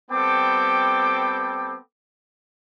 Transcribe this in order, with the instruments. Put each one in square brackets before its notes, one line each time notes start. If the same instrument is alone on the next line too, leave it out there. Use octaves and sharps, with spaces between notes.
[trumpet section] G3 B3 C4 A4 G5 D6